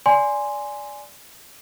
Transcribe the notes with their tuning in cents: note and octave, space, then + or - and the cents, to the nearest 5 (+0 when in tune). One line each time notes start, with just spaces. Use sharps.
D5 -15 G#5 +0 C6 +0